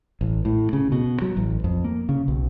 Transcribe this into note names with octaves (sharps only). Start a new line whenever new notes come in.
A1
A2
C#3
B2
F#3
A1
F2
A#3
C#3
B1